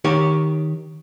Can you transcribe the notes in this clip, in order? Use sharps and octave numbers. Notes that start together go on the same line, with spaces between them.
D#3 G4 C#5